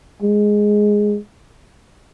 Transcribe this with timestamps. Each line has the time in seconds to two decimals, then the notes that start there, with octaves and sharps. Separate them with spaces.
0.22 G#3